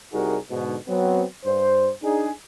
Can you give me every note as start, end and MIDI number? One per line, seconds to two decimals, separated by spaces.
0.13 0.38 36
0.13 0.38 55
0.13 0.38 63
0.13 0.38 66
0.13 0.38 68
0.13 0.38 70
0.50 0.76 44
0.50 0.76 47
0.50 0.76 50
0.88 1.23 54
0.88 1.23 59
0.88 1.23 60
1.45 1.90 43
1.45 1.90 72
2.03 2.30 62
2.03 2.30 63
2.03 2.30 68